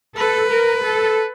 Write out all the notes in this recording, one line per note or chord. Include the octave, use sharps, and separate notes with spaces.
A4 B4
A#4
A4